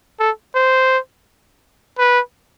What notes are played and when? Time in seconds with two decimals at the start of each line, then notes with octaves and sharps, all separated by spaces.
0.20 A4
0.55 C5
1.99 B4